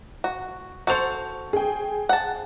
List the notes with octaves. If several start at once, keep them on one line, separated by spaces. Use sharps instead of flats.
F#4
F#4 A4 C5 C#7 F7
G#4 G5
F#5 A5